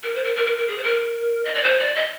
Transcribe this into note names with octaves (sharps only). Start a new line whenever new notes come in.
A#4
C5
A#4
A#4
A#4
A#4
G#4
C5
A#4
D#5
D5
C5
D5
D#5